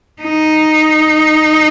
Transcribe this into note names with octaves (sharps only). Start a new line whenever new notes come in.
D#4